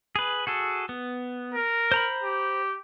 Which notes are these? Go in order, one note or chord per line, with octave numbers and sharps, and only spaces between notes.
G#4 B4
F#4 G#4 A4
B3
A#4
C5 A#5 B5
G4